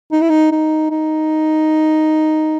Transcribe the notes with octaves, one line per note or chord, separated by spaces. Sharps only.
D#4
E4
D#4
D#4
D#4